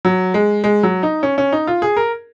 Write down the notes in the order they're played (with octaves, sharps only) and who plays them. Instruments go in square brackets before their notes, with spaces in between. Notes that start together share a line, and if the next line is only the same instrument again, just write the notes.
[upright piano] F#3
G#3
G#3
F#3
D#4
C#4
C#4
D#4
F4
G#4
A#4